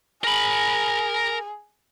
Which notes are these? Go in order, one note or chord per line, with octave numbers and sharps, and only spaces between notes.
G#4 A#4 B5